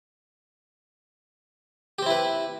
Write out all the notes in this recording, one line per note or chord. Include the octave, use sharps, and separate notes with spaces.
C4 E4 G4 B4